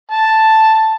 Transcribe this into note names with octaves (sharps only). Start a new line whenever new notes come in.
A5